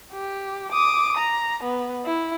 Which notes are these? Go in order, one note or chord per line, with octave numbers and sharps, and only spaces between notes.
G4
D6 D#6
A#5
B3
E4